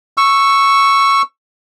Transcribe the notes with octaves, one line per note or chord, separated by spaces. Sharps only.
C#6 E6